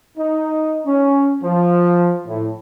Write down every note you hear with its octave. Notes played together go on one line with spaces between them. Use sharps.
D#4
C#4
F3
A2